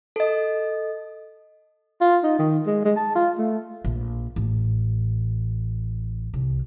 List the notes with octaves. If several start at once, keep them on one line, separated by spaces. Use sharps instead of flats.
A4 D#5
F4
D#4
D#3
G#3
G#3
A5
F4
A3
A#1
A1
C2